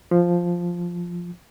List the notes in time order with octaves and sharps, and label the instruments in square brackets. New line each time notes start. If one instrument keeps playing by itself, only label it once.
[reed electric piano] F3